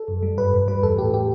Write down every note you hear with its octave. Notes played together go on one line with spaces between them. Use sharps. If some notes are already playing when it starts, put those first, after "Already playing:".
Already playing: A4
F#2
G3
G2 B4
G2
G3 B4
E2 A4
A2 G4
A2 G4